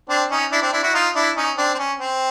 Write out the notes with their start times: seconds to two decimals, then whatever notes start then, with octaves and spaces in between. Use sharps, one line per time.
0.09 C4 D4
0.31 C#4 D#4
0.52 D4 E4
0.62 C4 D4
0.73 D4 E4
0.83 E4 F#4
0.94 D#4 F4
1.15 D4 E4
1.36 C#4 D#4
1.57 C4 D4
1.74 C4
1.78 C#4
1.99 C4